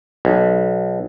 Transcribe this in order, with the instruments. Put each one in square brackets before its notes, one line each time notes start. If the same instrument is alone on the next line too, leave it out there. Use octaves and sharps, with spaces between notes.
[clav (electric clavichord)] B1